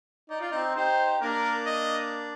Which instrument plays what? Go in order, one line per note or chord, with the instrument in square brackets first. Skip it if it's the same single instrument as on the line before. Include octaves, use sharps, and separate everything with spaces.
[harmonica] D#4 [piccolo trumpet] D5
[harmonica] F4
C4 D#4
[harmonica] D#4 G4 [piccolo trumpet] C5
[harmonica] A#3 D4 [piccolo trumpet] A#4
[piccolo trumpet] D#5